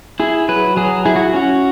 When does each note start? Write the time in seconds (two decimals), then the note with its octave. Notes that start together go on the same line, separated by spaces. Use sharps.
0.20 E4 G#4
0.49 F#3 B4
0.77 F#3 G#4
1.06 E4 G#4
1.16 F#4
1.34 C#4 F#4